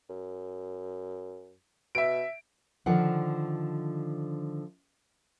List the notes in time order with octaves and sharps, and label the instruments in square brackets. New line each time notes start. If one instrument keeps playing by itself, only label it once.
[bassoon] F#2
[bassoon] B2 [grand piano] E5 D7
[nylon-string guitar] D3 D#3 F3 D4 F#5